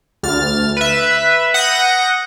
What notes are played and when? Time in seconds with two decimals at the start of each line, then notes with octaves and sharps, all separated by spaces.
0.23 D2 F6 A6
0.77 B4 E5
1.54 F#5 D#6 G6 A#6